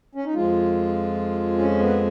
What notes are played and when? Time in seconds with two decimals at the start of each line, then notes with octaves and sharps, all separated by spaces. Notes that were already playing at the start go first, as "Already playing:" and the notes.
0.15 C#4
0.25 D#4
0.34 F2 F3 G#3 F4
1.59 C#4
1.79 B3